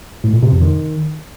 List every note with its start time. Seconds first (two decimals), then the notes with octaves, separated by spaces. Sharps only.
0.24 A2
0.33 A#2
0.43 C3
0.52 F2
0.61 D#3